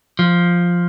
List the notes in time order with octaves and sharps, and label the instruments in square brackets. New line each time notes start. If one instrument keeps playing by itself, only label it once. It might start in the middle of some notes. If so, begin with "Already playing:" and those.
[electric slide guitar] F3